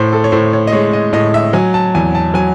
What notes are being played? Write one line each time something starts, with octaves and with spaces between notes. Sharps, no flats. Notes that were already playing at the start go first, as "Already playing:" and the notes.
Already playing: A2 C5
A4
C#5
A2 C5
C#5
D#5
G#3 C#5
D#5
A2 D#5
E5
F#3 G#5
A5
E2 G#5
A5
F#3 G#5